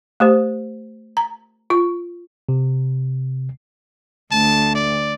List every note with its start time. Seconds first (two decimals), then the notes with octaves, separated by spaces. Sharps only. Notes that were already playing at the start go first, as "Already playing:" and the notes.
0.20 A3 G4 C5
1.17 A#5
1.70 F4 C#6
2.49 C3
4.31 D2 A5
4.75 D5